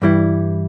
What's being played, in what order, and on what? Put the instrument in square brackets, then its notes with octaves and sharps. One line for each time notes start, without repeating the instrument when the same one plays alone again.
[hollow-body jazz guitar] G2 E3 G3 E4